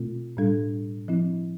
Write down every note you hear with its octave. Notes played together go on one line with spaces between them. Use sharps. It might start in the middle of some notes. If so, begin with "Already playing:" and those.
Already playing: B2 A3 C4 F4
A2 G3 D4 A4
F3 C4 E4